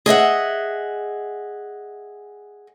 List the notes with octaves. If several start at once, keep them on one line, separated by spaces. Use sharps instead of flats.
G#4 D#5 E5 F#5